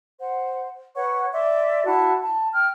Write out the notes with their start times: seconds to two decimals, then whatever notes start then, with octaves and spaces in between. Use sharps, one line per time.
0.20 C5 F#5
0.96 B4 C#5 F#5 C#6
1.32 D5 E5 C6 D6
1.85 E4 F#4 F#5 A5
2.23 A5
2.53 G5 F6